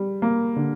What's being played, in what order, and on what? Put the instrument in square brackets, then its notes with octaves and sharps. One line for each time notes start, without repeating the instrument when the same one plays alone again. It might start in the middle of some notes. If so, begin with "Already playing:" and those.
Already playing: [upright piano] G3
A#3
D3